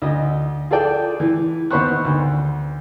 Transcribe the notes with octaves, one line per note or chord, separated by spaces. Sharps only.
D2 D#5
F4 G#4 A4 D5 G5
E3
D#2 B3 C5 B5 C#6 F#6
D2